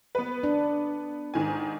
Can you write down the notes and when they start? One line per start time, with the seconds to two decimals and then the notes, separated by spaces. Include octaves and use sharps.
0.15 B3 B4
0.44 D4
1.34 G#2 D#3 G#5